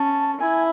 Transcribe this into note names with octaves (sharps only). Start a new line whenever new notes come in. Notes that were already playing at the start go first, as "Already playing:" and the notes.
Already playing: C#4 A5
E4 G#5